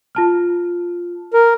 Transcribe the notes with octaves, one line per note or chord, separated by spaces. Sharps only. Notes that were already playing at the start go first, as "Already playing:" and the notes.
F4 A5 F6
A#4